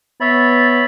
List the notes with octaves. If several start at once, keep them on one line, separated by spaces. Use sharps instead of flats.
B3 C#5 E5 B5 A6